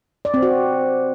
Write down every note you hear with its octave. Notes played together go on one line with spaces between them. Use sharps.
D5
C4
F#4